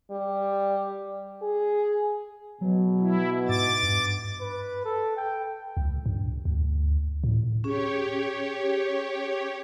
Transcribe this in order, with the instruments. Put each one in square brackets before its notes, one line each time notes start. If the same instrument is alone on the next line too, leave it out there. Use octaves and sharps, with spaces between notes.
[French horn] G3
G#4
[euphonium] B2 [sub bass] F#3
[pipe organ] E4
[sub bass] G#2 [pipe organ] D6 A6
[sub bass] G2
[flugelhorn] B4
A4
G5
[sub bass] C#2
G2
D2
A2
[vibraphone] C#4 G#4 [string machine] G4 C#5